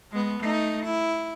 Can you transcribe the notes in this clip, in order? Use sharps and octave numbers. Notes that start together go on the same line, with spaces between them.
G#3 B3
A3 D#4
E4